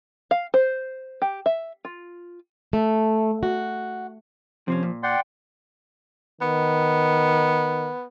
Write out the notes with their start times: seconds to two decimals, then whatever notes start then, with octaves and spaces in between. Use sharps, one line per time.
0.31 F5
0.54 C5
1.22 G4
1.46 E5
1.85 F4
2.73 A3
3.43 F#4
4.68 C3 F3 C4 C#4
4.83 A#2
5.03 D5 F#5 G5 C6
6.41 D#3 B3